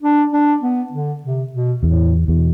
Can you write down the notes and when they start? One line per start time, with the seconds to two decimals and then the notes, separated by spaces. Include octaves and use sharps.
0.03 D4
0.32 D4
0.62 B3
0.92 D3
1.23 C3
1.53 B2
1.83 E2 A2
2.28 E2 B2